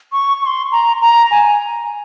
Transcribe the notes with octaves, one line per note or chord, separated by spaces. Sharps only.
C#6
C#6
C6
A#5
A#5
G#5